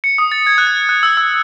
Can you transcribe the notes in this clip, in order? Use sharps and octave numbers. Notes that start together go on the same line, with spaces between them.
C#7
D#6
A6
G#6
F#6
G#6
F#6
E6
E6